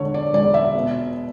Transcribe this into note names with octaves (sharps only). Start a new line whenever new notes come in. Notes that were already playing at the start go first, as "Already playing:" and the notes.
Already playing: E1 D3 C#5
D5
E1 D5
E5
B2